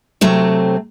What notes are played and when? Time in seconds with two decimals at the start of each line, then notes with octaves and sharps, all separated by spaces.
0.21 C3 F#3 A3 C4